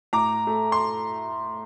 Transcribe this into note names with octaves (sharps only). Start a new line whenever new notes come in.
A2 A#5 D6
A3
C6